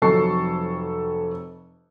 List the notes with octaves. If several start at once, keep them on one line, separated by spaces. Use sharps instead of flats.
F1 F2 F#3 A4 C#6 C7